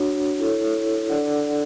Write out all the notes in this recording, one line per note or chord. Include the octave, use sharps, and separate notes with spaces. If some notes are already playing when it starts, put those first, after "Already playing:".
Already playing: D4 F#4 C#5 F#5
E4 A4 C#5
D4 A4 D5 F#5